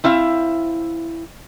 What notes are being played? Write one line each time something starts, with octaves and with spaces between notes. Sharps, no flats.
C4 E4 E5 F5